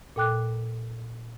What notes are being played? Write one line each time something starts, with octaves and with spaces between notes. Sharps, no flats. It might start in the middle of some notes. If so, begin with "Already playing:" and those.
A#2 A4 G5 D6 F#6